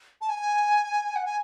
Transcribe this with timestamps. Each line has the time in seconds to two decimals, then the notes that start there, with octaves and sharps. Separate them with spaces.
0.21 A5
0.29 G#5
1.16 F#5
1.25 G#5